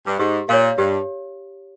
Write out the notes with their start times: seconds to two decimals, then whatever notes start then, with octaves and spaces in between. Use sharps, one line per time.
0.07 G2
0.19 G#2 G4
0.49 A#2 C#5 F5
0.77 G2 G4